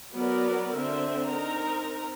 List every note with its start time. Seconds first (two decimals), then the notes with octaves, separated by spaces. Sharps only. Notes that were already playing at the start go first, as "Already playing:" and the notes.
0.13 F#3 B3 F#4 A#4 D5
0.75 D3 C4 E5
1.28 C4 D#4 A#4 A#5